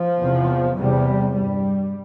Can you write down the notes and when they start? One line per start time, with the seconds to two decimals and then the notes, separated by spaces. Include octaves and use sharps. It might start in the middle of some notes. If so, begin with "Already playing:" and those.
Already playing: F3
0.19 E2 C3
0.76 E2 C3 G3
1.34 G2 G3